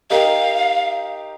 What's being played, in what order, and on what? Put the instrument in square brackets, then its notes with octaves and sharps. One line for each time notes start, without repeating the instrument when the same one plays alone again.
[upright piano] D#4 G4 A#4 [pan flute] F5